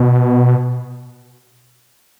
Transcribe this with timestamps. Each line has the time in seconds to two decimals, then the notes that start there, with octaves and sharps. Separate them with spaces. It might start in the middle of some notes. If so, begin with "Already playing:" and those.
Already playing: B2